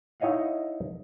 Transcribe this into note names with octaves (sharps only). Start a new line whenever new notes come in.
D#4 E4 C#5 D#5 F5 F#5